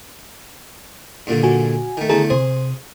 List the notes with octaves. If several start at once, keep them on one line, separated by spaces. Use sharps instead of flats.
G2 A#2 D3
F#4 G#5
D#3 A3
E2 D3 A3 G#4 A4 A#5
C3 G#4 C5